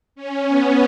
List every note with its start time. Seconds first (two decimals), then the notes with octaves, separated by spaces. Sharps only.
0.15 C#4
0.47 B3